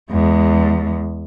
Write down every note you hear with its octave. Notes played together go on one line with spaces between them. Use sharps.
E2 G#3